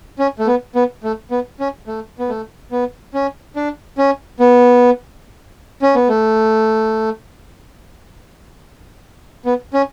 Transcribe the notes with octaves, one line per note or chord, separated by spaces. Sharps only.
C#4
A3
B3
B3
A3
B3
C#4
A3
B3
A3
B3
C#4
D4
C#4
B3
C#4
B3
A3
B3
C#4